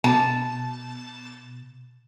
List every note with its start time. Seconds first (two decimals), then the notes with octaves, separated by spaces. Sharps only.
0.04 B2 A5